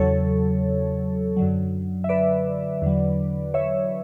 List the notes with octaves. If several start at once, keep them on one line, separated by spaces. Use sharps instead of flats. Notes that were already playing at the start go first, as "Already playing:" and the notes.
Already playing: E2 C#3 F#3 A4 C#5
F#2 D3 F#3
E5
B4 D5
E2 D3 F#3
C#5 E5